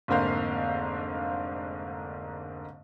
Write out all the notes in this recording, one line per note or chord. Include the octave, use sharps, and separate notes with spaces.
F1 G#2 D3 A#3 C5 F5